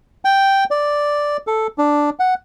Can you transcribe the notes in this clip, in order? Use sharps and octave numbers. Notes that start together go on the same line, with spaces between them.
G5
D5
A4
D4
F#5